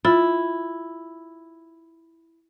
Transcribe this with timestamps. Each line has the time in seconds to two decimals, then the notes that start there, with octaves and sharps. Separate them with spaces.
0.05 E4 F4 A6